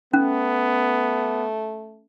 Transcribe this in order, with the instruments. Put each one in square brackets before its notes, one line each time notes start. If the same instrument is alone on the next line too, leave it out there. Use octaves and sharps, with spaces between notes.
[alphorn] A3 [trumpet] B3 [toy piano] C#4